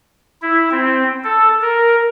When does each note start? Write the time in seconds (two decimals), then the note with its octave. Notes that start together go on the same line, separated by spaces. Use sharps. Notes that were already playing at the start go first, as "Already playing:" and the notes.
0.42 E4
0.71 C4
1.24 A4
1.62 A#4